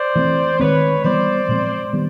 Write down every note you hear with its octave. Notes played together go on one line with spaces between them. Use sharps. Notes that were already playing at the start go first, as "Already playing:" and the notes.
Already playing: C5 D5
E3 A3 C4
D#3 G#3 C4 B4 C#5
E3 G3 B3 C5 D5
A#2 F3 G#3 C4
D#3 G3 B3 D4